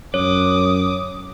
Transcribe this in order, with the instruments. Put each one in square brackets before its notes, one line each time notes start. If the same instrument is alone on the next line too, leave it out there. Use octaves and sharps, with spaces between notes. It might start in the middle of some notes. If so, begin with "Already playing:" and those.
[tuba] F#2 [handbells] C#5 [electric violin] D6 D#6